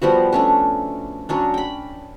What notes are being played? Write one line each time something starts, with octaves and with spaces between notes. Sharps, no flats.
F3 G3 B3 F#4
A3 C#4 D4
F#3 C#4 D4
G5 B5